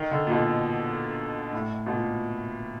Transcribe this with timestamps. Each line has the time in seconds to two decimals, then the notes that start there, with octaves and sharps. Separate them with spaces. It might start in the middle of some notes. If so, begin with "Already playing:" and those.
Already playing: D#3
0.11 D3
0.27 A#2
0.32 B2
1.53 A2
1.86 B2
1.93 A#2